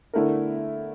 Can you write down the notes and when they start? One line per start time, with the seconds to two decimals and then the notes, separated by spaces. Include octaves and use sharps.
0.13 D3 A3 E4 A#4